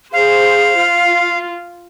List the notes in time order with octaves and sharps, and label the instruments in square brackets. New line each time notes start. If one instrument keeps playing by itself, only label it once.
[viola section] G#4 C5 [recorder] F5
[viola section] F4